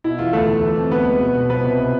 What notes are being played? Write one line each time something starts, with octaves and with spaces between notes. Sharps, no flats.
B2 E4
E2 F4
D2 A3 A4
D2
E3
F2
D2 B3 B4
G#3
B2
B1
F3 B3 B4
C2